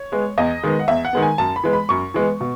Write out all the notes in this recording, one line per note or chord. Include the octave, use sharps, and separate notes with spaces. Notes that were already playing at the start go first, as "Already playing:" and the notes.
Already playing: C#5
G#3 B3
E2 D#5
D#3 G#3 B3
F#5
E2 E5
F#5
D#3 G#3 B3
G#5
F#2 A5
B5
E3 G#3 B3
B5
F#2 C#6
E3 G#3 B3
B2